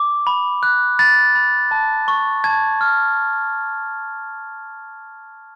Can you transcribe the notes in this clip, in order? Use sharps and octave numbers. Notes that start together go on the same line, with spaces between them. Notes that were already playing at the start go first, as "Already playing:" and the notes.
Already playing: D6
B5
F#6
B5 A6
B5
A5
C#6
A5 G#6
F6